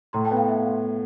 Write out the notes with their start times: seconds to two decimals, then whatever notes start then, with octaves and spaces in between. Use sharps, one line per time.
0.13 A2 A#5 C6
0.25 G5 A5
0.31 B3
0.37 F5 G5
0.48 E5 F#5